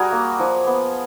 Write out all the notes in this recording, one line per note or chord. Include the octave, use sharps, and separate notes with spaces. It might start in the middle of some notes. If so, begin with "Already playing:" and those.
Already playing: G3 F#4 G#4 A#4
A#3
F3
B3